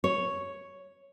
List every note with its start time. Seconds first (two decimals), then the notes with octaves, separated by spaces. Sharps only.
0.04 C#5